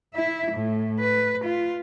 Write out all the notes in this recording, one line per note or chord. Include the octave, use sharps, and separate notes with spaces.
E4 E5
A2
B4
F4